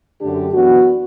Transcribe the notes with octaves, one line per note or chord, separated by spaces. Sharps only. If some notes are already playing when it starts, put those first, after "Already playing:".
F#2 D3 A3 D4 G4
F#2 E3 B3 D4 F#4